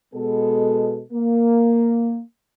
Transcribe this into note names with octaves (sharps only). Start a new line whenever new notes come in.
B2 G#3 B3 A4
A#3